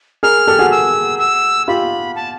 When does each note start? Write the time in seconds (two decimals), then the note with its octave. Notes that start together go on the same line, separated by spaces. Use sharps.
0.23 G#4 A#4 F6
0.47 G4 A4
0.59 F#4 G#4
0.71 E6
1.19 E6
1.68 F4 G4 B5
2.16 A5